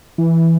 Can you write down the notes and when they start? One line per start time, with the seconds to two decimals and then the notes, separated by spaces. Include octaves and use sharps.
0.18 E3